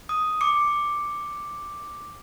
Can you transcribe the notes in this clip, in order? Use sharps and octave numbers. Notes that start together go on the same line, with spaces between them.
D#6
D6 C#7